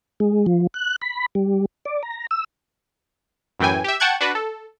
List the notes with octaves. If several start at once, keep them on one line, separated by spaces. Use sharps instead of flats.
G#3
F3
F#6
B5
G3
D5
A#5
E6
F#2 A2 E3 G5 G#5
G4 E5
F#5 G5 A5 C#6 F#6 G#6
D4 F#4 B4
A4